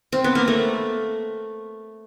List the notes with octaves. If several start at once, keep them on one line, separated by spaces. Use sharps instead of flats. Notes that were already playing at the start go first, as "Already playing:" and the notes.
C4
B3
A#3
A3